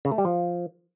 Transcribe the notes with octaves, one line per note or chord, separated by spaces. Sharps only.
C#3
A3
G3
F3